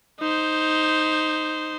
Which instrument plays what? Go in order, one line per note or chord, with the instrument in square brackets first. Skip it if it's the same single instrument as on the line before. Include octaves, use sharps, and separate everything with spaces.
[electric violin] D#4 C5